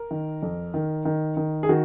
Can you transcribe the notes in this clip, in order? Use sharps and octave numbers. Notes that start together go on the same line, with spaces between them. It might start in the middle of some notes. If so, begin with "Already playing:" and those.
Already playing: A#4
D#3
F2
D#3
D#3
D#3
G#4
D#3 F#4